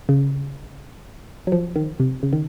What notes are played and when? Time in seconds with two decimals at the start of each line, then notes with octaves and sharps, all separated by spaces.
0.09 C#3
1.47 F#3
1.52 F3
1.76 D#3
2.00 C3
2.23 C#3
2.33 D#3